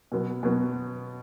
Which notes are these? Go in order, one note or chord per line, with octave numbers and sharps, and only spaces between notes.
B2 F#3 B3
B2 F#3 B3